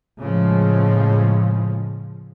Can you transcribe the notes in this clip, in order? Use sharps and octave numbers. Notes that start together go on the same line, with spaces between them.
A2 C#3 F3 G#3